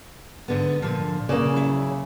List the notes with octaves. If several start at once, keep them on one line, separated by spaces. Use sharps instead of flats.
G#2 D3 B3
A#2 D3 F3
C#3 A#3 D5
F#3 E4